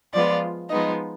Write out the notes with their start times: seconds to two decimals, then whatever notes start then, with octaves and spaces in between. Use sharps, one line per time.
0.13 F3 G#3 B3 F4 D5
0.70 F3 G#3 B3 D#4 D#5